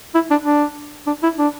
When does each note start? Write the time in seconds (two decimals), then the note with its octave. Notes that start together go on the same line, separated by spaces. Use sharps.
0.15 E4
0.30 D4
0.46 D4
1.07 D4
1.23 E4
1.38 D4